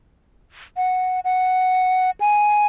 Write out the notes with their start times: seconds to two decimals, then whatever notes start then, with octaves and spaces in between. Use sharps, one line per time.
0.77 F#5
1.24 F#5
2.21 G#5